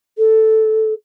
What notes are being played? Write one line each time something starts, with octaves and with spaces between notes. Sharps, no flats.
A4